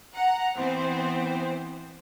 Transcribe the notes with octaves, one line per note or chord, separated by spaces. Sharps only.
F#5 A#5
E3 B3 C4 C5